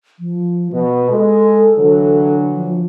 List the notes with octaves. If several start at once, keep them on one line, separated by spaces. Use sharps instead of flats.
F3
B2 B3
G#3 A4
D3 E3 F#3
F3